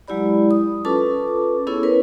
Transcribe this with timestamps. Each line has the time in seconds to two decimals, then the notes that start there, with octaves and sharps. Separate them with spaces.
0.08 F#3 G#3 E4 G4 D5 B5
0.51 D#6
0.85 C#4 F4 A4 B4 A5 D6
1.67 B3 C#4 E4 G#4 A4 C#5
1.83 A#4 B4 C#5